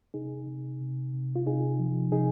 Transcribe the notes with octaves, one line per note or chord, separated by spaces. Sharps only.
C3 D#4 G#4
C3
C3
C3
F4
C3 D#4 G#4
F3
C3 D#4 G#4